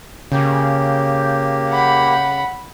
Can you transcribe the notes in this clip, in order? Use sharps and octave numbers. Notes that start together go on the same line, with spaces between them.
C#3 A#3 G4
F#5 B5